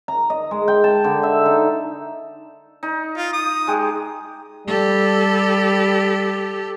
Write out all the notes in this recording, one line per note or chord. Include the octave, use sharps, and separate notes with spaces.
A#5
D#5
G#3
G5
A5
D3
E5
D#4
D#4
F4
D#6
G#3 G4
G3 G4 A4